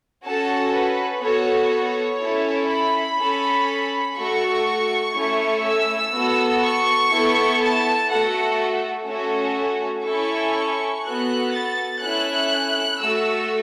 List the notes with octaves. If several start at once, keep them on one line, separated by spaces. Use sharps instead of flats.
C#4 F#4 A4 A5
B4
B3 F#4 A4 C#5
C#5
C#4 E4 A4
B5
C#4 A4
A3 F#4 A4 C#6
A3 C#4 E4 A4
E6
B3 F#4 A4
C#6
B3 E4 A4
A5
A3 F#4 A4 F#5
A3 C#4 F#4 A4
C#4 E4 A4 C#6
B3 F#4 A4 F#6
A6
C#4 E4 A4 F#6
A3 F#4 A4 E6